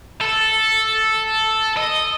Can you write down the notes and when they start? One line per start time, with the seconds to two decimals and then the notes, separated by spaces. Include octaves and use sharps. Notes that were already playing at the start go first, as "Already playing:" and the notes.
0.21 A4
1.77 D#5